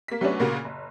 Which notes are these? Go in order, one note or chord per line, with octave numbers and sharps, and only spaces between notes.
A#3 B6
F#3 A3 B3 C#4 D4 F#4
A#2 C#3 A#3 F#4
F#1